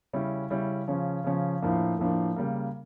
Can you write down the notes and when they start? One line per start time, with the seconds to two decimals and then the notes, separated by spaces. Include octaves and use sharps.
0.13 C#3 G3 C#4 E4
0.50 C#3 G3 C#4 E4
0.88 C#3 F3 C#4
1.24 C#3 F3 C#4
1.62 A2 F3 A#3 D4
1.99 A2 F3 A#3 D4
2.36 C#3 G3 A#3